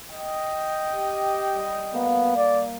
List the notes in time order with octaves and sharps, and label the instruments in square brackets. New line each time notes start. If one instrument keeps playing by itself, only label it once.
[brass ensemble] D#5 G5
[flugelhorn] G4
[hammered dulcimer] G3
[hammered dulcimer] A#3 [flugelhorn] B3
[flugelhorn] D5